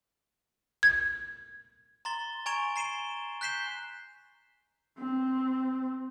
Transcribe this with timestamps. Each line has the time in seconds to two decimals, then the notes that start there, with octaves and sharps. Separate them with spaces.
0.83 G#6
2.05 A#5 C6 A6 G7
2.46 G#5 A#5 C#6 G#6 D7 F7
2.76 A#5 C7 D#7 E7 G7
3.41 F#6 G6 B6 C7 E7 G7
4.98 C4